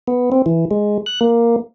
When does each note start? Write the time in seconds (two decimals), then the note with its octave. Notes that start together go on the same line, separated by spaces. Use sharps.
0.08 B3
0.32 C4
0.46 E3
0.71 G#3
1.06 F#6
1.21 A#3